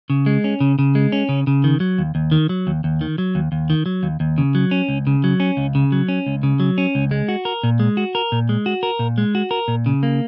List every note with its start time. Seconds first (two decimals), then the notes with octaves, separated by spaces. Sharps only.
0.10 C#3
0.26 G#3
0.44 C#4
0.60 C#3
0.79 C#3
0.95 G#3
1.12 C#4
1.29 C#3
1.47 C#3
1.64 D#3
1.80 F#3
1.98 D#2
2.15 D#2
2.32 D#3
2.49 F#3
2.67 D#2
2.84 D#2
3.01 D#3
3.18 F#3
3.35 D#2
3.52 D#2
3.70 D#3
3.86 F#3
4.03 D#2
4.20 D#2
4.38 C#3
4.55 F#3
4.71 C#4
4.89 C#2
5.07 C#3
5.24 F#3
5.40 C#4
5.57 C#2
5.75 C#3
5.92 F#3
6.08 C#4
6.26 C#2
6.43 C#3
6.60 F#3
6.78 C#4
6.95 C#2
7.11 G#3
7.29 F#4
7.45 A#4
7.63 A#2
7.80 G#3
7.97 F#4
8.15 A#4
8.32 A#2
8.49 G#3
8.66 F#4
8.83 A#4
8.99 A#2
9.18 G#3
9.35 F#4
9.51 A#4
9.68 A#2
9.86 C#3
10.03 A#3